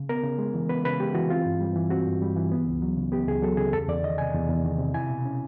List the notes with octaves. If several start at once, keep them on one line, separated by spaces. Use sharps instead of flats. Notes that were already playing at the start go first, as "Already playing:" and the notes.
Already playing: C#3
B3 A#4
C#3
G#3
E3
B3 B4
C#3 B4
G#3 G4
E3 F#4
C4 F4
G2
G3
E3
C4 F#4
G2
G3
E3
B3
C#2
F#3
C#3
B3 G4
C#2 G#4
F#3 A4
C#3 G#4
E2 A4
E2 D5
D#3 D#5
C3 G#5
E2
E2
D#3
C3
E4 G#5
B2
C#4